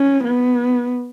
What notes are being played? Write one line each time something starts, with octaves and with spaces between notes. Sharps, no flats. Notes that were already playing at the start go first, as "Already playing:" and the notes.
Already playing: C#4
B3